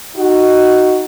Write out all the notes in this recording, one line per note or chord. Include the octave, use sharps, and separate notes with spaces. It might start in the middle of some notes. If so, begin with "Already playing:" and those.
D#4 F#4